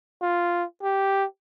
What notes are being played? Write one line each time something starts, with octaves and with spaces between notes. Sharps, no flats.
F4
G4